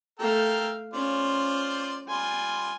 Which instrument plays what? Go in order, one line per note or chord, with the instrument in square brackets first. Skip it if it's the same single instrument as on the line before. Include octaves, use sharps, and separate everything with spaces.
[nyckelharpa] A3 F5 [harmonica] A4 A#4 G5
[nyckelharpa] C#4 [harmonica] F4 C5 D5
[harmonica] G3 F4 [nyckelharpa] G#5